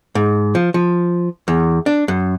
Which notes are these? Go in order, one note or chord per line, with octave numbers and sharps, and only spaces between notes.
G#2
F3
F3
E2
D4
F#2